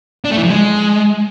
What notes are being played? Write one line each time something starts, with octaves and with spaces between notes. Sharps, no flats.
D4
A3
E3
F3
G#3